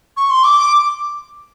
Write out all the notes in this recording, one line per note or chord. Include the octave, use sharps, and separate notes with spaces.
C#6
C6
D6
D6